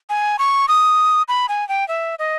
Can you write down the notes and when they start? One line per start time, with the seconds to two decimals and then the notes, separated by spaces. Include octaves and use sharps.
0.09 G#5
0.39 C#6
0.68 D#6
1.28 B5
1.49 G#5
1.69 G5
1.88 E5
2.19 D#5